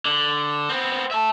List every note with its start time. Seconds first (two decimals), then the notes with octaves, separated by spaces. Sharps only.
0.06 D3
0.69 B3 C4
1.11 E5 A5